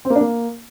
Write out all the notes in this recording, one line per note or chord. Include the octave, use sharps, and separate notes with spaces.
C4
A#3
D4
A#3